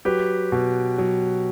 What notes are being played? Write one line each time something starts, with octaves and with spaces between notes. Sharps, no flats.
F#3 G4 B4
B2
F#3